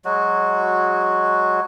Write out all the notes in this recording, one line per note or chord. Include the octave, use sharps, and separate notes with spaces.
F#3 G#3 F#4